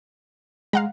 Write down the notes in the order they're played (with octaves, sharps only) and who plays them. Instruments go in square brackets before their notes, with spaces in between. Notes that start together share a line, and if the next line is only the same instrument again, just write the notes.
[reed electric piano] G#3 [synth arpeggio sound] F5 F#5 A#5